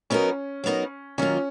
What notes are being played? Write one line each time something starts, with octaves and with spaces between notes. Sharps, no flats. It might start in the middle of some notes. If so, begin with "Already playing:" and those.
F#3 B3 C#4 D#4 F#4 A#4
F#3 B3 D#4 F#4 A#4
D#3 F#3 A#3 C#4 F4